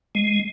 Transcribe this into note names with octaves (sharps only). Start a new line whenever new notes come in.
G#3